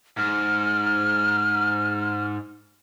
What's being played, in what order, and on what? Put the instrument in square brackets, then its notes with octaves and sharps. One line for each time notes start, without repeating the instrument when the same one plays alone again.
[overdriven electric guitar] G#2 [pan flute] F6